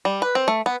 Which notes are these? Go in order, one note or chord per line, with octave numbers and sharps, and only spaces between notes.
G3
B4
C4
A3
B3